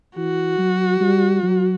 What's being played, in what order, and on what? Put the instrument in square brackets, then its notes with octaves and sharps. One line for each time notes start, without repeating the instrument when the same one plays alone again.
[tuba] E3 [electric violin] F#4
[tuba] F#3
G3
F#3